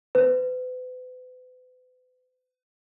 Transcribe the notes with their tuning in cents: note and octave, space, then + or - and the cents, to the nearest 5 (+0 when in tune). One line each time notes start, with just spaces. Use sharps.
B4 +40